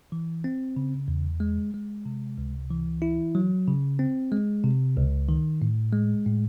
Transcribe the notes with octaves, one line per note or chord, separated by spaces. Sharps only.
E3
C4
C#3
E2
G#3
G#3
C3
C#2
E3
E4
F#3
C#3
C4
G#3
C3
C#2
D#3
A2
G#3
A2